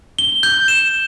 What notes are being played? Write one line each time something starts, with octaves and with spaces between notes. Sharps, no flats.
G7
G6
E7